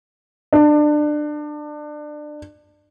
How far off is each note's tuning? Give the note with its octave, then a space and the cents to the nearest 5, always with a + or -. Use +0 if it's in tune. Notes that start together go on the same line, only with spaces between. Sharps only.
D4 +25